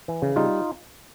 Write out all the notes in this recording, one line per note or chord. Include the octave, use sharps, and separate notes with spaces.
E3
C#3
G3 D#4 F4